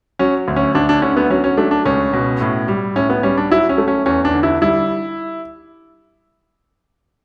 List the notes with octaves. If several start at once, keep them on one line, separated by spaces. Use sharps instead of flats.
F#3 C#4
D2
C#4
D2 D4
D4
D3 C#4
B3
F#3 C#4
C#4
A3 D4
D4
C#2 C#4
B2
A2
G3
A2 C#4
B3
G3 C#4
D4
F#3 E4
C#4
A3
C#4
E2 C#4
D4
D3
E4
G3 E4